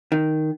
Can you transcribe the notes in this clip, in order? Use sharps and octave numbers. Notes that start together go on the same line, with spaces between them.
D#3